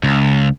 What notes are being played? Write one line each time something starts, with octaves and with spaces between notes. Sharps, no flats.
C#2